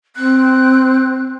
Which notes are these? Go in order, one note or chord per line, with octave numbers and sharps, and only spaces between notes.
C4 F#6